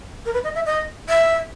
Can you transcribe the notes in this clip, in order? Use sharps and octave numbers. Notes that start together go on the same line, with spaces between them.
A#4
B4
D#5
E5
D#5
E5